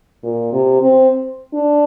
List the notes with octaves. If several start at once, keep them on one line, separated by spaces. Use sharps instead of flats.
A#2
C3
C4
D4